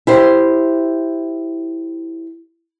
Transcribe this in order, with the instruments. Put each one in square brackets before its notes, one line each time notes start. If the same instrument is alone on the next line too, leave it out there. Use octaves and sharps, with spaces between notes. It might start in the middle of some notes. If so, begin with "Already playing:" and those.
[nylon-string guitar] E4 G4 C5